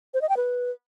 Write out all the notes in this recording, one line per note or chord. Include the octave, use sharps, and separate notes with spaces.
C5
D#5
G5
B4